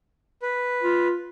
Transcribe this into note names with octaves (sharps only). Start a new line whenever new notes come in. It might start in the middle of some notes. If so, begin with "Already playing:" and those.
B4
F4